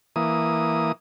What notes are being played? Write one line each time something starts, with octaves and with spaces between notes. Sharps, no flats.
E3 A#3 D#6